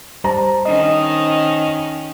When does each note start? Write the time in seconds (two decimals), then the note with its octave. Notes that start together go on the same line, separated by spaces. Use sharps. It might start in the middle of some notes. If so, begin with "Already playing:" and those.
0.24 G3 C5 A5 A#5
0.65 D#3 C#4 D#5